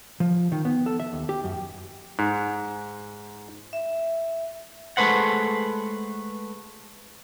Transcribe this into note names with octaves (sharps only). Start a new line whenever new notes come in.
F3
D#3
B3
A4
E5
D#2
G4
F#2
G#2
E5
G#3 A3 B4 C5 F#5